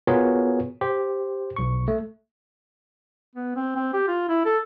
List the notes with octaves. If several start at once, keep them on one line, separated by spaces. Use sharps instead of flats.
B3 F4 F#4 G#4 A#4 C#5
G4 C5
B1 C#6
A3
B3
C4
C4
G4
F4
E4
A4